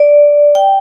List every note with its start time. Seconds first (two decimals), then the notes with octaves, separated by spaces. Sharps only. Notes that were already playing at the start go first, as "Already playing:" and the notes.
Already playing: D5
0.55 G5